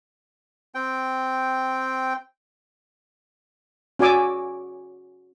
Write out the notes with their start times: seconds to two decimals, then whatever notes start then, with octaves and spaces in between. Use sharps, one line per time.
0.75 C4 G5
3.99 C#4 F#4 D5 G#5 D6 E6